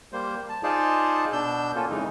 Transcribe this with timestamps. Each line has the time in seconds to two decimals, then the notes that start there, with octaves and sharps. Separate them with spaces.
0.13 G3 A#3 C5
0.49 A5
0.63 D#4 F4 G#4 C5 D5 A5
1.33 B2 D4 E6 G6
1.75 A#3 C#4 F4 A4
1.90 F2 C#3 E3 G#3 D#4